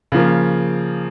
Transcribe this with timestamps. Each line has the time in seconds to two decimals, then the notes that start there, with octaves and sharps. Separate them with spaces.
0.12 C#3 F3 A#3